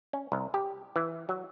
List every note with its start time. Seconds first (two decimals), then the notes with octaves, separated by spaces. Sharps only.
0.13 C#4
0.32 C2
0.54 G4
0.96 E3
1.29 F#3